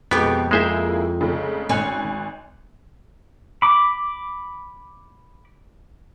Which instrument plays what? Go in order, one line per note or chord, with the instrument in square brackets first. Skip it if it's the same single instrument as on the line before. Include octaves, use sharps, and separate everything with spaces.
[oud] F2 G4 [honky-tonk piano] B2 G#3 [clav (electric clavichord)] B3
[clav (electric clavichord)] G#3 C5 E5 [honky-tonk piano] A#3 E4 G#4
[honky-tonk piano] F1 C#3
[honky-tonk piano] G#1 G#5 F#6 [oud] C#4
[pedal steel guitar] B5 D6